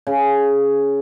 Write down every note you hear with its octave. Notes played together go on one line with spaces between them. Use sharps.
C#3